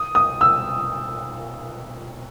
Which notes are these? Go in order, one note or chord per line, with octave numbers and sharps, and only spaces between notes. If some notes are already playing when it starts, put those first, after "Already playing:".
Already playing: D#6
D#6
E6